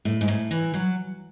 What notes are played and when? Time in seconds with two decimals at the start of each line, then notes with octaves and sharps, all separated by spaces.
0.05 A2
0.21 G#2
0.28 A2
0.51 E3
0.74 F#3